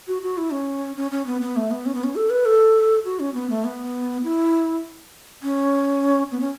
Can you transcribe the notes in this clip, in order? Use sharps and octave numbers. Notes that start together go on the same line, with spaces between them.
F#4
F#4
E4
C#4
C#4
C#4
B3
B3
A3
B3
C#4
B3
C#4
A4
B4
A4
F#4
C#4
B3
A3
B3
E4
C#4
B3
C#4